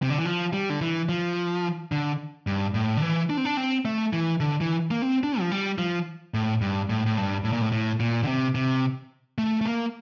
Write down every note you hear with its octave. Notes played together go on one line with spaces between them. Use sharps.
C3
D3
E3
F3
G3
D3
E3
F3
D3
G2
A2
D3
E3
D4
C4
D4
C4
A3
E3
D3
E3
A#3
C4
D4
F3
G3
F3
A2
G2
A2
A2
G2
A2
A#2
A2
A2
A#2
D3
C3
C3
A3
A3
A#3